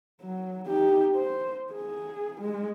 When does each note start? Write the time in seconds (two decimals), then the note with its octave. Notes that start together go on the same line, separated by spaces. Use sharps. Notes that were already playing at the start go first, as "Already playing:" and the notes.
0.21 F#3
0.67 D#4 G4
1.15 C5
1.73 G#4
2.41 G#3